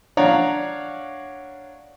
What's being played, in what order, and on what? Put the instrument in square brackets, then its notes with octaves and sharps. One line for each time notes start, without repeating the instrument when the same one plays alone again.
[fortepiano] D4 C#5 D5 F5 F#5 A#5